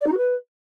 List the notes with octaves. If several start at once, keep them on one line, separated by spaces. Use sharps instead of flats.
D5
D#4
F#4
B4